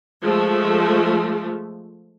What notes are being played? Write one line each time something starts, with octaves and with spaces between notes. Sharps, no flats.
F3 G#3 A3